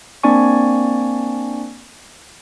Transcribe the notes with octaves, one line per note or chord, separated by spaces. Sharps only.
A#3 C4 D4 D5 G#5 C#6